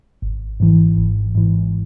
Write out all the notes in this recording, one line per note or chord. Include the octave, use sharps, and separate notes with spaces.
G#1
G#2 E3
G#1
G#2 E3